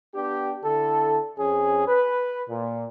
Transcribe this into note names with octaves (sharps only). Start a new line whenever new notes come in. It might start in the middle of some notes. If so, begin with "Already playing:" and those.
B3 D4 G4
D3 E4 A4
F2 C#4 G#4
B4
A#2